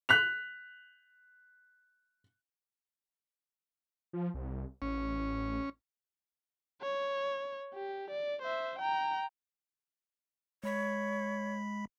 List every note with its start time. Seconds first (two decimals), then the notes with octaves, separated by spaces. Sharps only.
0.09 F#6 B6 F7
4.13 F3
4.34 C2
4.82 A1 C#4
6.82 C#5
7.74 G4
8.11 D5
8.42 C5 E5
8.79 G5 A#5
10.64 G#3 C#5 B5 B6